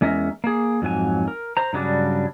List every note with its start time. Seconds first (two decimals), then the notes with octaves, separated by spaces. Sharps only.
0.01 E2 G#3 C#4 A#4 E5
0.44 A#3 G#4
0.82 F2 G#2 F#3 G#5
1.28 A#4
1.57 C5 A#5
1.73 G2 C#3 F#3 G3 D4